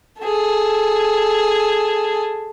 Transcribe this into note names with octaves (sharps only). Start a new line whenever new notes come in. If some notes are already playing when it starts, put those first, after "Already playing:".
G#4 A4